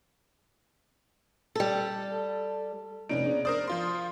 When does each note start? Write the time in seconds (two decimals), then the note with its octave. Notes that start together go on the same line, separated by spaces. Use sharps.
1.55 G3 A4
3.09 F1 B3 C#4 D#4 D5 D7
3.23 D4 G#4 D5
3.45 A#4 C5 D5 D#6
3.68 F3 F4 C6